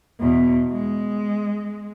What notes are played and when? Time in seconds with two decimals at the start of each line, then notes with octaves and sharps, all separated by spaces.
0.20 E2 B2
0.72 G#3